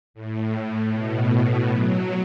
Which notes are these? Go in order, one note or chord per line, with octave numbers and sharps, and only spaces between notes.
A2
B2
F#3